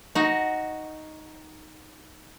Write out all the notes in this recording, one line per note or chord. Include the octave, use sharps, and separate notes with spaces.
D#4 F#4